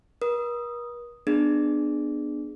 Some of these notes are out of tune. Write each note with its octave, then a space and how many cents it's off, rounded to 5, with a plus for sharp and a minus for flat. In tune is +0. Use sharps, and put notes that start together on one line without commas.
A#4 +45 D#6 +0
B3 +0 D4 +20 G#4 +0